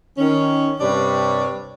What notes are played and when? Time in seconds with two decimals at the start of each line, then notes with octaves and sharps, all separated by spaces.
0.18 D#3 C#4
0.80 G2 C3 G3 C#5 D5